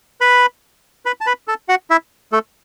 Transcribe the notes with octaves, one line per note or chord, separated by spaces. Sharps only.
B4 B5
B4 B5
A5
B4 B5
A4 A5
F#4 F#5
E4 E5
A3 A4